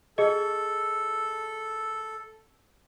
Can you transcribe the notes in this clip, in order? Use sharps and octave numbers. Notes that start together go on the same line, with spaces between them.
G#4 A4 D#5